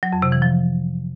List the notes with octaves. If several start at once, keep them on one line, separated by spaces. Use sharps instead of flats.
F#3
F2
C3
E3
F3